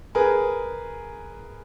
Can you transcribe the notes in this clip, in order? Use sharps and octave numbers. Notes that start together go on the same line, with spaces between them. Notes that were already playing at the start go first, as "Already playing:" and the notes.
G#4 A#4 B4